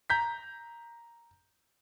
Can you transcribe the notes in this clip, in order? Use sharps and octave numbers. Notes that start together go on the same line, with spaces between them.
A#5 G6 B6